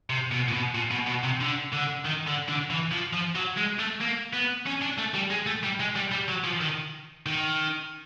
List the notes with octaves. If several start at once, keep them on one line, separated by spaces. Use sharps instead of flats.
C3
B2
A#2
B2
A#2
B2
B2
C3
D3
D3
D#3
D3
D3
E3
F3
F3
F#3
G#3
A3
A#3
B3
C#4
D4
A3
G3
G#3
A3
G3
G#3
G3
G3
F#3
F3
D#3
D#3